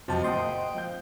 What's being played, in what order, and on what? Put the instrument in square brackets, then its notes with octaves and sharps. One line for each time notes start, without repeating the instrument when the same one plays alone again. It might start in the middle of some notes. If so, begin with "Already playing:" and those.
[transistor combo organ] F2 C3 [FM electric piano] F#3 A5 [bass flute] D#5
[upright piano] F#1 A#2 F#5 [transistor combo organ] G5 [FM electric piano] C6 D#6
[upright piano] F3 C5 G6